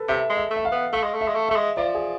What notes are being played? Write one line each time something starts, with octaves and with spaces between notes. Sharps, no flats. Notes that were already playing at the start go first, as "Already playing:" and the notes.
Already playing: A4 B4
C3 E5
G#3
E5
A3
E5
F5
B3
A3 F5
G#3
A3
E5
G#3
A3
A3 E5
G#3
F3 D5
G#4